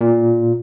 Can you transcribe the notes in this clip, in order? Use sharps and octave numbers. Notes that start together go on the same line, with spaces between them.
A#2